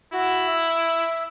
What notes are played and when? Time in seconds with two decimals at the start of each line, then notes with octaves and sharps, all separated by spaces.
0.13 E4 F#4
0.48 E5